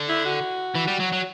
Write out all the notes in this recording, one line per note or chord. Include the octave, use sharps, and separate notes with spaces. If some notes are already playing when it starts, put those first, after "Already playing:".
Already playing: D3
E4
F#4
E3
G3
F#3
F#3